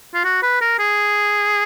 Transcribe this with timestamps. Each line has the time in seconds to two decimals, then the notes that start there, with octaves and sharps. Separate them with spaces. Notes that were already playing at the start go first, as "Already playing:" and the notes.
0.14 F4
0.24 F#4
0.43 B4
0.61 A#4
0.79 G#4